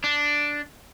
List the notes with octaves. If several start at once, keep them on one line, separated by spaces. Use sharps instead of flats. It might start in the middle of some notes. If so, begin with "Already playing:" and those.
D4